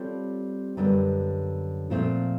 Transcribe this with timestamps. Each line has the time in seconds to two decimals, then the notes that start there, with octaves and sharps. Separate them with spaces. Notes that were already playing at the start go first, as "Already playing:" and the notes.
Already playing: G3 C4 F4 A4 C#5
0.77 F#2 D3 G3 B3
1.90 A#2 F3 A3 C4 F4